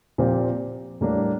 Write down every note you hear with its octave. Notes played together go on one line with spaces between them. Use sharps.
A#2 F3 C4 G4
A2 G3 A#3 D4